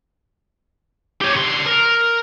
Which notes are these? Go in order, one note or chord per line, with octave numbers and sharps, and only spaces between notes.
G4 C#5
D3 C6
A#4